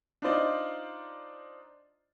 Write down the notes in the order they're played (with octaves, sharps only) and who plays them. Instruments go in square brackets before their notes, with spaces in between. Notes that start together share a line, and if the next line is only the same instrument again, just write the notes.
[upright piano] D4 D#4 F4 C5 D5 D#5